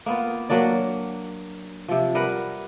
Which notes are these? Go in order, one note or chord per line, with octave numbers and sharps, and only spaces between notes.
A#3 B3 F4
F#3 A#3 D4 D5
C3 F3
G3 A#4 B4 F#5